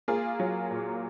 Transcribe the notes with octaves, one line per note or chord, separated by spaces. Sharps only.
A#3 F4 G#4
F#3
A#2